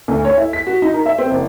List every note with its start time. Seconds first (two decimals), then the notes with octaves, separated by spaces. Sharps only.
0.08 D2
0.25 C#5
0.37 E4
0.53 B6
0.67 F#4
0.82 D#4
0.94 A#4
1.06 E5
1.18 C4
1.31 F#1